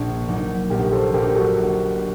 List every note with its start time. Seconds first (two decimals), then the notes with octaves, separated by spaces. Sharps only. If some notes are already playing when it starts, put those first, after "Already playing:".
Already playing: A#1
0.27 A#2 F#3 A#3 D#4
0.70 A#1 G4 A#4
0.92 A4 C5
1.13 A#2 F#3 A#3 D#4 G4 A#4
1.35 F#4 A4
1.56 A#1